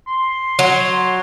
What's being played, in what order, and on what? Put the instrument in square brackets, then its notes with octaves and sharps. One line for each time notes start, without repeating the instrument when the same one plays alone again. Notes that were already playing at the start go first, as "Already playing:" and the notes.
[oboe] C6
[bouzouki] F#3